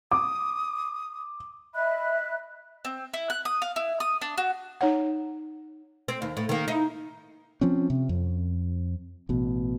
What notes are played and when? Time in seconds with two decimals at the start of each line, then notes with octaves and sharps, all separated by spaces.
0.11 D6 D#6
1.74 D#5 E5 B5 F#6
2.85 C4
3.14 E4
3.30 F#6
3.45 D#6
3.62 F5
3.76 E4
4.00 D#6
4.21 D4
4.38 F#4
4.81 D#4 C#5 F#5
6.08 C4
6.22 D#2
6.37 A2
6.49 D#3 A#3
6.68 D#4 E4
7.61 F3 C4 C#4
7.90 C3
8.09 F2
9.29 A1 B2